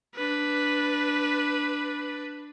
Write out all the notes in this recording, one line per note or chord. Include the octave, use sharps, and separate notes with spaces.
D4 B4